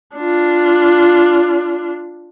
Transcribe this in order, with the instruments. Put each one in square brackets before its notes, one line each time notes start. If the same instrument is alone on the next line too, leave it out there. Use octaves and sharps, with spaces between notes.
[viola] D4 F4